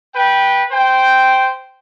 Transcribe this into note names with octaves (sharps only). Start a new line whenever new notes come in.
B4 G5
C5 G5